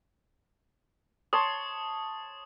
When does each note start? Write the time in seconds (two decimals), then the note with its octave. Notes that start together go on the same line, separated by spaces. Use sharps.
1.33 C#5 A5 C6 D#6